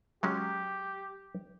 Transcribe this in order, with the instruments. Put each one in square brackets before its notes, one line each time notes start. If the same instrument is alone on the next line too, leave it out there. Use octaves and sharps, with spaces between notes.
[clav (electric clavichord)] F#3 G#3 C#4 [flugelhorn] G4